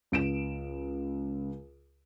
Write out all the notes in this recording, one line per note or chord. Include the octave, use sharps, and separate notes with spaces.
C#2 D7 E7